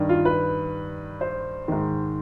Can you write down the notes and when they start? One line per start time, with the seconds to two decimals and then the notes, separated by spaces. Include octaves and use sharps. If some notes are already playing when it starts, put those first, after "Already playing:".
Already playing: G2 D#3
0.09 F4
0.25 B4
1.21 C5
1.68 G#2 D#3